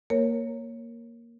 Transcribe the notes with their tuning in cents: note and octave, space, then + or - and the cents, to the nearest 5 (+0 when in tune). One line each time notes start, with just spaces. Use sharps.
A#3 +0 A#4 +0 C#5 -5